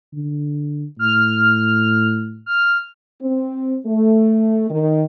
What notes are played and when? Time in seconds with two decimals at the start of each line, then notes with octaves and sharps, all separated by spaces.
0.14 D3
0.99 A2 F6
2.46 F6
3.22 C4
3.86 A3
4.70 D#3